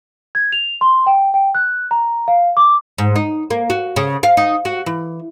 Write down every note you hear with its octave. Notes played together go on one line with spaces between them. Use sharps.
G#6
F7
C6
G5
G5
F#6
A#5
F5
D6
G#2
D#4
A#3
F#4
C#3
F5
D#4
F#4
E3